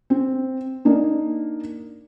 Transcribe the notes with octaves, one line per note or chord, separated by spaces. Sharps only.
C4
A#3 D4 D#4